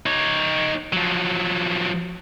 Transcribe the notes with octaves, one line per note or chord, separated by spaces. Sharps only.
D#4 C#5
F3 F#3